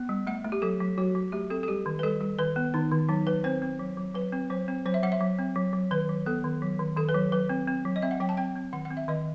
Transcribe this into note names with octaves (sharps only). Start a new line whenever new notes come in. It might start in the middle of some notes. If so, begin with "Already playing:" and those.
Already playing: B3
G3
A3 F#5
A3
G4
F#3 A4
F#3
F#3 F#4
F#3
A3 G4
C4 A4
A4
G3 G4
D#3
B4
G3 A4
G3
D#3 B4
B3
D#3 D#4
D#3
F#3 D#4
F#3 B4
C4 C5
C4
F#3
F#3
F#3 B4
C4
F#3 C5
C4
F#3 C5
E5
F#3 F#5
E5
F#3
C4
F#3
F#3
D#3 B4
F#3
B3 A4
D#3
F#3
D#3
D#3 A4
B4
F#3
F#3 B4
C4
C4
F#3
D#5
C4 E5
F#5
F#3 G5
A5
C4 G5
C4
D#3 F#5
F#5
C4
E5
D#3 D#5